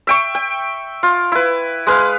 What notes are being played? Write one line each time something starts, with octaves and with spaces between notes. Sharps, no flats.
E5 G5 C#6
G5
F4
E4 B4
G#3 B4 F5